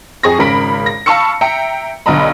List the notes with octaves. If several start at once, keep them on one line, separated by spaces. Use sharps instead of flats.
F2 G#4 C#6 A#6
G#1 C#3 A#4 B5 B6 D7
A#6
F5 A5 B5 C#6 E6 C#7
E5 G5 A#5 C#7
B1 D3 B3 D#5 A#5 B5